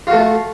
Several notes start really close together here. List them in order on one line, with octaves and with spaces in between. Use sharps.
F4 F#4 A3